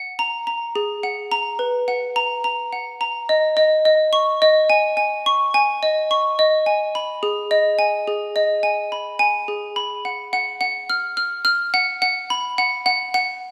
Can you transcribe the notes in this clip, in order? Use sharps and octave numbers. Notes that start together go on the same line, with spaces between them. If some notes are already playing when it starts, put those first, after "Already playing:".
Already playing: F#5
A#5
A#5
G#4
F#5
A#5
B4
F#5
A#5
A#5
F#5
A#5
D#5
D#5
D#5
C#6
D#5
G#5
G#5
C#6
G#5
D#5
C#6
D#5
G#5
B5
G#4
D#5
G#5
G#4
D#5
G#5
B5
G#5
G#4
B5
F#5
F#5
F#5
F6
F6
F6
F#5
F#5
B5
F#5
F#5
F#5